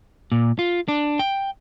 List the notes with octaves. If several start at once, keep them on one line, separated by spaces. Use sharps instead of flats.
A#2
F4
D4
G5